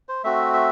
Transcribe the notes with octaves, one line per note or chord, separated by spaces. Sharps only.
C5
A3 C4 F#4 E5
E5